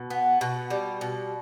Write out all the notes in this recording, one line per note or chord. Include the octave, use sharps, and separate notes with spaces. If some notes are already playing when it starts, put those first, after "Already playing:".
Already playing: B2
B3
B2
G3
B2